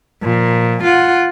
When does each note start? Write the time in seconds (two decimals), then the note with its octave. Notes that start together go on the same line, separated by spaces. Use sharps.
0.23 A#2 F3
0.83 F4 F#5